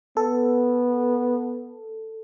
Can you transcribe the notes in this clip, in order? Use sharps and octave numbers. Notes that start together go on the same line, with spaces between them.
B3 A4